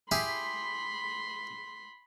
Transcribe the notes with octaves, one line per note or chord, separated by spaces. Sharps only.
E4 G4 G#4 B5 C6